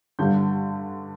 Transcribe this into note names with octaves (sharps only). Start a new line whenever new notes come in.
G2 D3 G3 G6